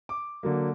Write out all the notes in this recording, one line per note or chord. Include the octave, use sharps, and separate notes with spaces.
D6
D3 F#3 A#3